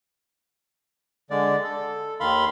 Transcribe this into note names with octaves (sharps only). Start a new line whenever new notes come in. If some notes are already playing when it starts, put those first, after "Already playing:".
D3 G#3 D5
A4
D#2 D#3 F5 B5 C6